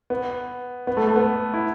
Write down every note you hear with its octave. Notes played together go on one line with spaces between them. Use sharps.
B3
B3
A3
A3
B3
E4